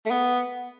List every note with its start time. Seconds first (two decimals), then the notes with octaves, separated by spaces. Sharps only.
0.06 A3
0.10 B3